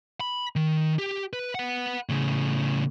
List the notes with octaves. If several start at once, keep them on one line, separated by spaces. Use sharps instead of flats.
B5
D#3
G4
B4
B4 F#5
A2 C#3